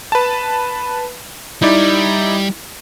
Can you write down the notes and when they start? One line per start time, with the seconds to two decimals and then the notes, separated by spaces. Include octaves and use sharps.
0.12 B4 A5
1.62 G3 D#4 E4 D5